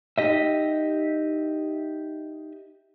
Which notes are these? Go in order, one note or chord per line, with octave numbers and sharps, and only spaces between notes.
D#4 G4 D#5 E5